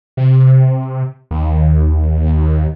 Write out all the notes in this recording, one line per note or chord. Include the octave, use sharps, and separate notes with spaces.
C3
D#2